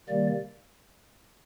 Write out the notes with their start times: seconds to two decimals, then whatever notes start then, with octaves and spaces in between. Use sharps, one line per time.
0.09 C3 D#3 G3 A#3 D5